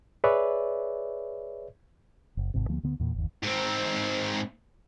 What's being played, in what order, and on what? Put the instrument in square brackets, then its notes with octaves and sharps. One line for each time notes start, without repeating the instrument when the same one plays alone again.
[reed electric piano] G#4 B4 C#5 D5 E5
[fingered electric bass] F#1
G#1 G#2 C3
D2 F3 A#3 B3
D2 D3 B3
E2 A#2
G1 D#2
[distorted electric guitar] G#2 C4